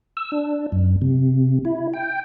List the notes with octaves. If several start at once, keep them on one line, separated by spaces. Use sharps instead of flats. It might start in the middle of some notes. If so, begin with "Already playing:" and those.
E6
D4
F#2
C3
E4
G5